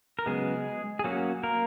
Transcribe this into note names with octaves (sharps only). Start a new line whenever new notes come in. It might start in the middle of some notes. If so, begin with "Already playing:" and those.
A#4
C#3 F#3 G#3 B3 G#4
G#4
F#3 A#3 C#4 F#4
A#3 A#4